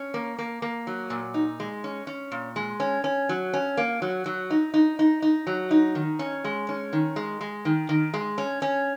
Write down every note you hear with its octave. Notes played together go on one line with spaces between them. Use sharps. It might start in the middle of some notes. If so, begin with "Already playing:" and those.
Already playing: C#4
A#3
A#3
A#3
F#3
A#2
D#4
G#3
C#4
C#4
A#2
G#3
C#4
C#4
F#3
C#4
A#3
F#3
F#3
D#4
D#4
D#4
D#4
F#3
D#4
D#3
C#4
G#3
C#4
D#3
G#3
G#3
D#3
D#3
G#3
C#4
C#4